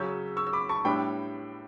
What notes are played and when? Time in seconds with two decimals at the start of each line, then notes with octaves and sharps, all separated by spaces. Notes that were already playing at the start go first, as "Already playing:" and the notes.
Already playing: C#3 F#3 C#4 E6 G6
0.37 C#6 E6
0.47 E6
0.53 B5 D6
0.69 A5 C#6
0.84 A2 G3 B3 D4 G5 B5